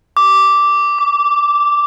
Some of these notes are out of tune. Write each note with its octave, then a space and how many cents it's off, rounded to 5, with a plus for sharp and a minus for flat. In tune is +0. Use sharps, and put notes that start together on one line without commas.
D6 -10
D6 -35